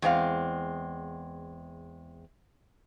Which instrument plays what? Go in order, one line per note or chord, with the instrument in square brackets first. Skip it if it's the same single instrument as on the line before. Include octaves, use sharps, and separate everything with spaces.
[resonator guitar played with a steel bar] E2 G#3 C4 F5